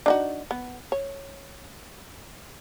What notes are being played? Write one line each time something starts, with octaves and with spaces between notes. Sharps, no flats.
D4 D#4 F#4
B3
C#5